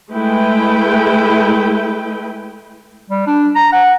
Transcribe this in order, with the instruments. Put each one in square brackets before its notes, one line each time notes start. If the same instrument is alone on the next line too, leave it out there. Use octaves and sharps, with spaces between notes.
[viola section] G#3 A3 E4 B4 G5
[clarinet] G3
D4
A#5
F#5